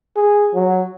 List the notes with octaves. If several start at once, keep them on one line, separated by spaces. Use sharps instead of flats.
G#4
F#3